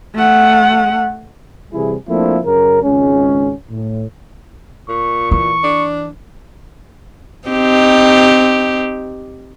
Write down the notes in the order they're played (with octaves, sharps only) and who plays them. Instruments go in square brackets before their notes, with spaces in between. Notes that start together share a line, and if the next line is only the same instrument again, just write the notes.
[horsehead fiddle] A3 F#5
[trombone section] C3 E3 G3 E4 G#4
F3 A3 A#3 C4 D4 E4
F#2 C#3 C#4 A#4
G#1 C#2 G#3 C#4
A2
[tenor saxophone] A#2 [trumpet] C#6
[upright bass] E3 [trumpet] C#6
[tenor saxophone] D4
[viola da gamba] C4 D#4 G4